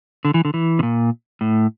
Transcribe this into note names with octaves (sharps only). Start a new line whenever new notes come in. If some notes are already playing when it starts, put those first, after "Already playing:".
D3
E3
D3
E3
C3
A#2
A2